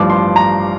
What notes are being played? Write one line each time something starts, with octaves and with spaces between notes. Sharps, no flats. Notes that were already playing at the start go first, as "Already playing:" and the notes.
Already playing: A1 G2 F3 D6
C6
A#5